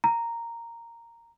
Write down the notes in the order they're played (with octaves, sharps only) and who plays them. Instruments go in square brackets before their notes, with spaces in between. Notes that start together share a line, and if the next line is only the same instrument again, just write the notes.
[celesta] A#5